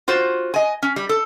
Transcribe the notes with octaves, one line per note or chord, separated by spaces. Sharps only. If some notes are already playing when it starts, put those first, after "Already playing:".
F4 F#4 C5
D#5 G#5
C#4
G3
A4